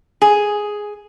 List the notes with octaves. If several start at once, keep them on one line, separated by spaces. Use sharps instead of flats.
G#4